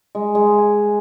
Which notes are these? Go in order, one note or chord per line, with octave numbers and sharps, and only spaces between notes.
G#3
G#3
G#5